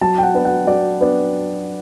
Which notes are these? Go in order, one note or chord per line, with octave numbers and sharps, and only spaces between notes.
F#3 A5
G5
F#5
B3 D4
F#5
F#3 D5
B3 D4